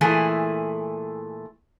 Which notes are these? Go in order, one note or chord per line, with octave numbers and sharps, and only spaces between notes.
A#2 E3 A3 E4 G#4